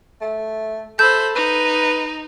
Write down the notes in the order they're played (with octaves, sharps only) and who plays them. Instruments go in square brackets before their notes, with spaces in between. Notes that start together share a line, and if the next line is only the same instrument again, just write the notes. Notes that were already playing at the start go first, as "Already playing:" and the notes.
[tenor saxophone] A3
[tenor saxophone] A4 [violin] C5 B5 [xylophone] G6
[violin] D#4 [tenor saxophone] B4